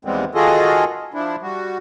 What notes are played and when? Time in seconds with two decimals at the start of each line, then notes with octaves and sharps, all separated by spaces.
0.05 D#2 E3 G3 G#3 B3 C4
0.35 D#3 F4 F#4 G#4 A4 D#5
1.14 F3 D4 E4
1.42 G3 F#4